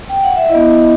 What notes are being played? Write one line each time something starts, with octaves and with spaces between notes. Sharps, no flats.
G5
F#5
E5
B3 E4 D#5